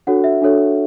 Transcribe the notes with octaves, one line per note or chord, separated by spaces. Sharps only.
D4 F#4 A4 C#5 F#5
E5
D4 F#4 A4 C#5